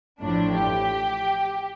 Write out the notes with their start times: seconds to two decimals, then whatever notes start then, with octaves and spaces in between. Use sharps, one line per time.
0.21 A1 A2 F3 D4
0.55 G4